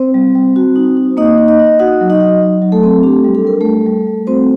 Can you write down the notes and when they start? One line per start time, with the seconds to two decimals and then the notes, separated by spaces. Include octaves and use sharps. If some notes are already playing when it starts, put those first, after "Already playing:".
Already playing: C4 C5
0.14 G3
0.35 G3
0.56 F#4
0.76 D#4
0.97 D#4
1.17 A#3 D#4 D#5
1.38 D#4
1.48 D#4 D#5
1.59 D#4
1.79 D#4 F#4 F#5
2.01 F#3
2.10 D#4 D#5
2.20 D#4
2.41 F#3
2.62 F#3
2.72 A3 A4
2.83 C4
3.03 D4 G4
3.24 G3
3.35 A4
3.45 G3 A#4
3.61 G3 A3 A4
3.86 G3
4.07 G3
4.27 C4 F#4 C5